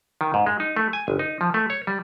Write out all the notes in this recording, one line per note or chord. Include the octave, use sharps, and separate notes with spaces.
D#3
G#2
G#3
D#4
A3
G#5
G1
D#4
F3
A3
C#5
G3